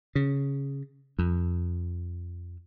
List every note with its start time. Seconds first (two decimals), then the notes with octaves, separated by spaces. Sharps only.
0.15 C#3
1.19 F2